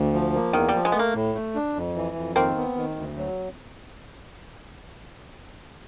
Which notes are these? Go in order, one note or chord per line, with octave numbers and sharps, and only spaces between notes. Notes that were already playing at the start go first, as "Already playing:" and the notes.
Already playing: D2
F3
A#3
E2 D#3
G3
F3
G#3
B3
A3 A#3
A2
A3
D4
F2
E3
F2
D#3 A#3 C4
B3
D#3
D2
F#3